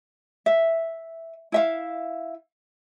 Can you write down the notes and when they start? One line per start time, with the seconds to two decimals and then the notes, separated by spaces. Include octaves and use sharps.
0.46 E5
1.52 E4 E5 F5